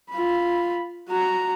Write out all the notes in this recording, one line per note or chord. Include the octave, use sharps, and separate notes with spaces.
F4 B5
F#4 A#5